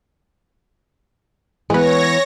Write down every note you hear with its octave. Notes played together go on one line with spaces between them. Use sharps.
E3 G#3 B3 B4 C#5 A#6